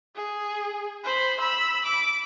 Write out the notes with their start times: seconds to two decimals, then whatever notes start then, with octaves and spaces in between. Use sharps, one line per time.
0.15 G#4
1.04 C5 B5
1.40 B5 E6
1.85 D6